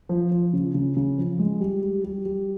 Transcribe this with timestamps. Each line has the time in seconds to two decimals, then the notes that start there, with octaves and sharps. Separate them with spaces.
0.09 F3
0.32 F3
0.53 C#3
0.75 C#3
0.97 C#3
1.18 F3
1.39 G#3
1.60 G3
1.82 G3
2.04 G3
2.25 G3